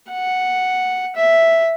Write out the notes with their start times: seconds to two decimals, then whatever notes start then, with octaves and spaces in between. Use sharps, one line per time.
0.11 F#5
1.16 E5